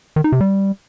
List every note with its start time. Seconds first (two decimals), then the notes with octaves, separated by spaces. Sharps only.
0.16 D#3
0.24 D#4
0.32 C3
0.41 G3